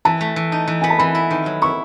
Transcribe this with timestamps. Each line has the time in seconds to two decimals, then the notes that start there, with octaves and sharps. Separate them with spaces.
0.05 E3 A5
0.21 A3
0.36 E3
0.52 D#4
0.67 E3
0.82 B3 G#5
0.90 A5
0.99 E3 B5
1.15 E4
1.30 D#3
1.46 F#3
1.62 E4 C#6